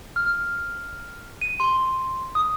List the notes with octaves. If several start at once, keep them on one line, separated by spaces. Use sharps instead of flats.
F6
D#7
C6
D#6